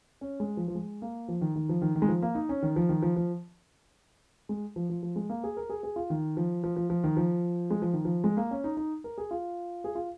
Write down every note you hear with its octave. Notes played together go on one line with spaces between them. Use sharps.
C#4
G#3
F3
F3
G#3
A#3
F3
D#3
D#3
F3
D#3
D#3
G#3
F3
A#3
D#4
C#4
D#3
F3
D#3
F3
F3
G#3
F3
F3
F3
G#3
A#3
G#4
A#4
G#4
G#4
F4
D#3
F3
F3
F3
F3
D#3
F3
G#3
F3
D#3
F3
G#3
A#3
C#4
D#4
D#4
A#4
G#4
F4
G#4
F4